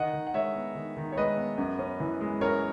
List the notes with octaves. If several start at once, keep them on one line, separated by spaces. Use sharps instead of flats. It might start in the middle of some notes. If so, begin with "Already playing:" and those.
Already playing: D#3 D#5 F#5
D#3
F#5
G#3 C#5 E5
B3
D#3
D#3
C#5
G#3 B4 D#5
B3
F#2
C#4
E3
G#3
F#2 A#4 C#5